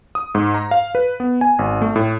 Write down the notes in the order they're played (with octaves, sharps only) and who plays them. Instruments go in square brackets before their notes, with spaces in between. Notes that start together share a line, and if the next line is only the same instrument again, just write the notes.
[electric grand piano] D#6
G#2
A#5
F5
B4
B3
G#5
G#1
A3
A2